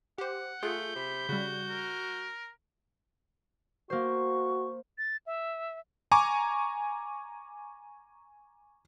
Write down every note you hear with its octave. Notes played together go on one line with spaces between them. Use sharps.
G4 C5 F#5
A3 F4 G#4 G6
C3 B5
C#3 G3 F#4
A#4
A#3 F#4 C5 C#6
A6
E5
G#5 A#5 C#6 D6